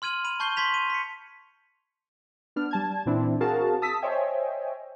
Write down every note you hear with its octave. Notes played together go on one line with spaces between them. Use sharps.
C6 F6 G#6 D#7 F#7
B5 D#7 F#7
A5 C#6 G6 C7 G7
C6 G#6 B6 F7
D#7
B6 C#7
B3 D4 F6
G3 A5 G#6
A#2 E3 C4 D4 E4
C4 F#4 G#4 A#4 F5 A5
A5 D#6 E6 B6
C5 C#5 D#5 E5 G5 G#5